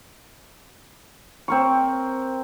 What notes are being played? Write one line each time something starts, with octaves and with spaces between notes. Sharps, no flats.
C4 A#4 C#6